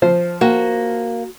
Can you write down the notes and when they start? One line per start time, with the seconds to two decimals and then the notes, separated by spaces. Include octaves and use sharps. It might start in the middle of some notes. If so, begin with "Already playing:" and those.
0.02 F3 C5
0.41 A#3 F#4